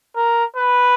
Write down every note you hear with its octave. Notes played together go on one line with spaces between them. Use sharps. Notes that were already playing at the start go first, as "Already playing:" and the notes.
A#4
B4